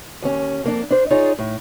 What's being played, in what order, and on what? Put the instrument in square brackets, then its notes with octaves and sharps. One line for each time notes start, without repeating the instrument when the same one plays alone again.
[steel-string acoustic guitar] D#2 C#4
F2 A#3 D4
D4 C5
D#4 F4 G#4 C#5 D5
A2